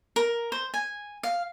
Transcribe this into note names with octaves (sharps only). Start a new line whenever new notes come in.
A#4
C5
G#5
F5